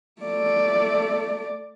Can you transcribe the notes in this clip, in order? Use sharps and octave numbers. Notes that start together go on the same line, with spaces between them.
A3 D5